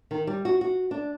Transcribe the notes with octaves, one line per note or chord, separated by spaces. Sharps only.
D#3
G3
F#4
F#4
D4